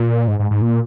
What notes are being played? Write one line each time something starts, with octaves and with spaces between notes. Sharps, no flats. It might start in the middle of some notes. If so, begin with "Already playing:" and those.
Already playing: A#2
G#2
G#2
G#2
A#2